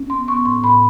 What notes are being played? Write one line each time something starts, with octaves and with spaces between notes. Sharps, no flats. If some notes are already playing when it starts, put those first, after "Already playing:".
Already playing: C#4
B3 C6
B3 C#6
A2 C6
A2 B5